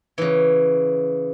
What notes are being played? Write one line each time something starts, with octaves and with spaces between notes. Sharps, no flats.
C#3 E3